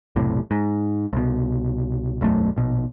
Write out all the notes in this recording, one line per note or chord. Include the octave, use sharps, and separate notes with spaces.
F1 B1 A2 C3
G#2
C2 B2
E1 B1 F#2 A3
A#1 B2